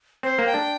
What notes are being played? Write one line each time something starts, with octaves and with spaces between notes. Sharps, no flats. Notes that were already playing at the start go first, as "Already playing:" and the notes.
C4 C5
A#3
G5
D4